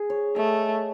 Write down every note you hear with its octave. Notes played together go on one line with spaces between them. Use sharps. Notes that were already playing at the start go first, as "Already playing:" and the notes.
Already playing: G#4
C#5
A3 D#5